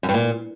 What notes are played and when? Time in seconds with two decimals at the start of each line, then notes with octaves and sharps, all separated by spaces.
0.03 F#2
0.09 G2
0.14 A#2